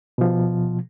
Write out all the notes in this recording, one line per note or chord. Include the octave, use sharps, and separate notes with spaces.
B2 F3